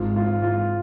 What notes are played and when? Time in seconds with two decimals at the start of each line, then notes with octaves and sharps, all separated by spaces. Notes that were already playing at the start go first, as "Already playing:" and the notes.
Already playing: G#1 G#2 F4
0.16 F4
0.42 F4